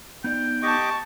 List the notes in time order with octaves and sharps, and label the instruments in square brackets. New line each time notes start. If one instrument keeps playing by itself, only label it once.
[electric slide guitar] B3 D#4 D5 [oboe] G5
[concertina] G4 D#5 D6 [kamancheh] A5 C#6